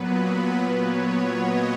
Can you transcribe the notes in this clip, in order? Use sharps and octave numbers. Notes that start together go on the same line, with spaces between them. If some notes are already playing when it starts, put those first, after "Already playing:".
Already playing: A#2 F#3 B3 B4
C#5
D#5